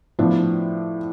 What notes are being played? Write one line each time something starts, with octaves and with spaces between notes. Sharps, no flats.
A2 F3 B3 D4